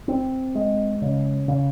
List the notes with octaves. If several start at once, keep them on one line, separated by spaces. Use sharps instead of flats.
C4
G#3
C#3
C#3